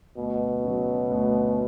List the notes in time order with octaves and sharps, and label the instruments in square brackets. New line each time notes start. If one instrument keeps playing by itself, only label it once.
[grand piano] D2 [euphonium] B2
[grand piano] C#3 F#3
D2